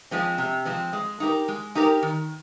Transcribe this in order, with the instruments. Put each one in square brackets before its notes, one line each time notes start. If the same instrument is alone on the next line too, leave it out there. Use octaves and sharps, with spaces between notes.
[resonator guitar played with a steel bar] F3 G#3 C4
C3
F3 G#3 C4
G#3
D#4 G4 A#4
G#3
D#4 G4 A#4
D#3